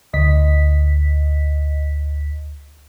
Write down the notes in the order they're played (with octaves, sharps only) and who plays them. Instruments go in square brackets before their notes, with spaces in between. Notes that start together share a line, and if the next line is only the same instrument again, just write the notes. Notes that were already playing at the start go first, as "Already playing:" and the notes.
[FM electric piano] D2 D#5 B6